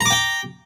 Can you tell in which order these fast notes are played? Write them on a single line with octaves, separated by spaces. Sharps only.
A#5 D6 G5